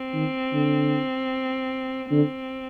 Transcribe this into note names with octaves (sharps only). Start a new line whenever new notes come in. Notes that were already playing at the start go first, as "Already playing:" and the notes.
Already playing: C4
D#3
D3
D3 C4